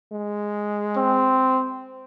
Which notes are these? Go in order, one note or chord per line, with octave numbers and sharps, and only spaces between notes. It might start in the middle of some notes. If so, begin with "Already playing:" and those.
G#3
C4